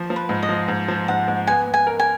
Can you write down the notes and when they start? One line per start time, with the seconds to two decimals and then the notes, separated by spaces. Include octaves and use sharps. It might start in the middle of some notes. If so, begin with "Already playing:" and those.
Already playing: F3
0.10 F3
0.16 B4
0.29 G#2
0.43 D#5
0.49 F3
0.68 G#2
0.88 F3
1.08 G#2 F#5
1.28 G#2
1.47 B3 G#5
1.68 B3
1.74 G#5
1.87 A#4
2.00 G#5